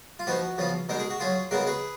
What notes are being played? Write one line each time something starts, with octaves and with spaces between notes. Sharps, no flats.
F4
F3 B3 D#4 F#4
C#3 F3 B3 F4
B2 G#3 D#4 A#4
G#4
F#4
F#3 C#4 F4 G#4
C#3 G#3 B3 D#4 F#4 A#4
G#4 B4